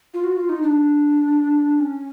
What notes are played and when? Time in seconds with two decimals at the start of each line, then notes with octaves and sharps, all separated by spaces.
0.14 F4
0.24 F#4
0.36 F4
0.49 D#4
0.62 D4
1.80 C#4